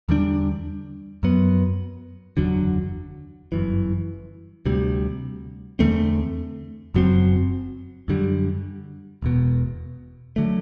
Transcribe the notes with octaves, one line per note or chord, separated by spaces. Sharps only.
E2 D3 G3 D4
F#2 F#3 B3
F#1 E2 D3 F#3
G1 F#2 E3
D2 C3 G3
E2 D3 A3 C4
F#1 F#2 F#3 C4
F#2 D3 G3
E1 E2 B2
D3 F#3 A3